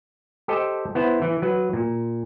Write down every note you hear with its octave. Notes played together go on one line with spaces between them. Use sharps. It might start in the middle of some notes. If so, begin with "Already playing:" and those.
G4 A4 C5 D#5 G5
B3 E4 C5
E3
F#3 B4
A#2